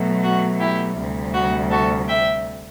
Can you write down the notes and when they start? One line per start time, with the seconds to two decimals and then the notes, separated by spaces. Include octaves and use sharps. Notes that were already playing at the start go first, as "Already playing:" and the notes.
Already playing: B2 F#3 A3
0.23 F#4
0.60 E4 G4
0.97 D2 C3 G3
1.34 F#4
1.71 F#4 A4
2.08 E5 G5